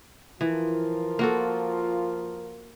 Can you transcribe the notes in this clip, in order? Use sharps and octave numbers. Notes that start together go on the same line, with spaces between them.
E3 F3 F4 A#4
A#3 F#4 A4